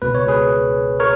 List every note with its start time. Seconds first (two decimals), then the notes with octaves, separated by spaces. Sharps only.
0.02 C#2 B2 B4
0.15 C#5
0.28 G#4 B4
1.00 A#4 C#5